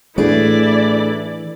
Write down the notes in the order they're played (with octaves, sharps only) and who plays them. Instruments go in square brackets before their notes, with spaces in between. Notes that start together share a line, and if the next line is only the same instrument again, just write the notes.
[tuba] A2 [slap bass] E3 [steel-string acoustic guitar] A3 D4 G#4 [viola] E4 D5